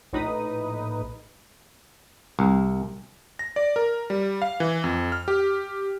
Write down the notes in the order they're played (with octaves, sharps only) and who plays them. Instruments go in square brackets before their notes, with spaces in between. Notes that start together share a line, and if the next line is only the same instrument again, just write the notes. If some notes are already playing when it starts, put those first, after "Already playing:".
[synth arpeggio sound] A#1 A2 D#4 B4 B5 D#6
[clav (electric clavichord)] C2
[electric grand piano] A#6
D5
A#4
G3
F5
E3
F2
F6
G4